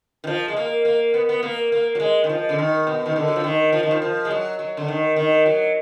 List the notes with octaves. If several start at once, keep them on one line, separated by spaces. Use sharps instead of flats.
D#3
F3
G#3
A#3
A#3
B3
B3
A#3
A#3
F#3
G#3
D#3
F3
D3
D#3
B2
D#3
D3
F#3
F3
D#3
F3
D#3
F3
F3
G#3
F#3
F#3
D3
D#3
D#3
F#3